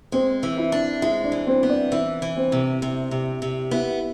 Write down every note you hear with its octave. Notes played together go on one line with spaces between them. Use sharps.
G#3 C4 C5
E3
E4 E5
D4
G#3 E4 E5
D4 D5
E3
C4 C5
B3
D4 D5
E3 E4 E5
E3
C4 C5
C3
C3
C3
C3
B3 E4 E5